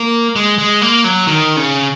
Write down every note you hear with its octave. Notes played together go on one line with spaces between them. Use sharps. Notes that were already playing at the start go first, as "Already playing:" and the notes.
Already playing: A#3
G#3
G#3
A#3
F#3
D#3
C#3